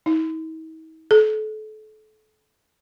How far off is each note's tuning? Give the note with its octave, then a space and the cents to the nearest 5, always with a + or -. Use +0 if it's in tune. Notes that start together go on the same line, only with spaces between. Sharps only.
D#4 +45
A4 -35